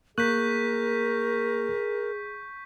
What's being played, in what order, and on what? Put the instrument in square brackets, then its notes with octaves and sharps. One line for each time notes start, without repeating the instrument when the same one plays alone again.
[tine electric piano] A#3 F#6 [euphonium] G#4 [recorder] A#4 [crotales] C#6 G6 B6